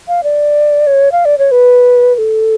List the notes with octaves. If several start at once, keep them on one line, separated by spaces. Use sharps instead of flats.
F5
D5
C#5
F5
D5
C#5
B4
B4
A4